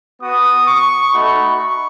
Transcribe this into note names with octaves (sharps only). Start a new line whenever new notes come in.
B3 F#4 D#6
C#6
A3 D#4 F#4 B5
C#6